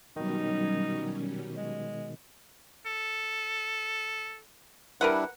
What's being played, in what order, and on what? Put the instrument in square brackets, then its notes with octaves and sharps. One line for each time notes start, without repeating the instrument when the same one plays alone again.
[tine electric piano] B2 D#3 [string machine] F#3 G3 C#4 [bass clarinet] D#4
[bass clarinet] G#3
[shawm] A4
[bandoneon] G3 D4 E4 [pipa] A#4 B4 F#5